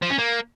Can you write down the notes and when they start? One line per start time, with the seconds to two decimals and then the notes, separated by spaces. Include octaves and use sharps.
0.02 F3
0.10 C#4
0.18 A#3